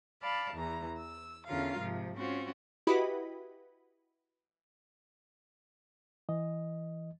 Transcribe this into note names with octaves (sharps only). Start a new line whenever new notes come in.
D5 F5 A5 B5
E2 E3 A#5
E6
E2 D3 C#4 F4 A#4 F5
G#2 C3 F3
C4 C#4 F4 F#4
E4 F#4 G4 B4 D#5 B5
E3 D#5